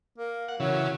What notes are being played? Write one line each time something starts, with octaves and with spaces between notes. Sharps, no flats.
A#3
F#5
C#3 E3 F#3